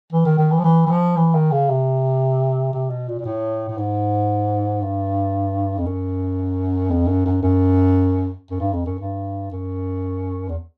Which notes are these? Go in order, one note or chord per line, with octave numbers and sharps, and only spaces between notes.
E3
D#3
D#3
E3
F3
E3
E3
F3
E3
D#3
C#3
C3
C3
B2
A#2
A#2
A2
A2
G#2
G2
F2
F#2
F2
F#2
F#2
F#2
F#2
G2
F2
F#2
G2
F#2
E2